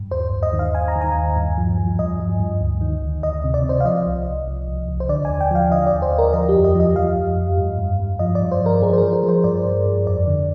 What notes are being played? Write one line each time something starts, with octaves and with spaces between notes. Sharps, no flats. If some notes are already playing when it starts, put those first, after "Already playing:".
Already playing: G2
D#2 C5
D#2
D#5
D#3
F5
D#2 G#5
A#5
D#3
G#5
D#2
G2
F3
F3
G2 D#5
F3
G2
D2
D#3
D2
D2 D#5
C3
D5
C3
C5
F5
F3 D#5
C2
C2
C2
C2
C2
C5
D3 D5
D#2 G#5
G5
F3 F5
D3 D#5
D5
D#2
C5
D#2
A#4
F3 D#5
G4
F2
D#5
F3 D#5
F3 F5
F2
F2
G2
G2
G2
F3 D#5
D5
G2
C5
F3 A#4
F3 G#4
C5
F3 A#4
C5
F3
C5
G2 D5
G2
G2
F2 D5
D3